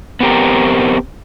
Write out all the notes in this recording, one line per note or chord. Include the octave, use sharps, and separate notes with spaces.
B3 C4 G4 A#4